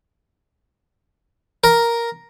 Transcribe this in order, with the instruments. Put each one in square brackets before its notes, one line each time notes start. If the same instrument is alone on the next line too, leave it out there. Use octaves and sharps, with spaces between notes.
[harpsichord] A#4